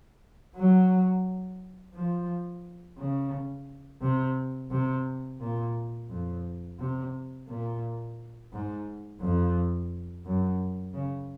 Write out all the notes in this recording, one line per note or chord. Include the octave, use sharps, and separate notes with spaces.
F#3
F3
C#3
C3
C3
A#2
F2
C3
A#2
G#2
F2
F#2
C#3